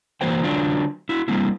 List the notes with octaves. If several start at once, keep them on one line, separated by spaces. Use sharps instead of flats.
E3 A#3 F#4 C5 G5
D3 F#3 D4 F4 G5
E4 F#4
G3 A#3 C4 E4